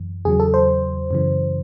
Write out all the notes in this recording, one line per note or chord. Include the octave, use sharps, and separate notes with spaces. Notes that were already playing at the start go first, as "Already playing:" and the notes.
Already playing: F#2 E3
E2 C#3 F#3 G#4
A4
C5
F#2 C#3 E3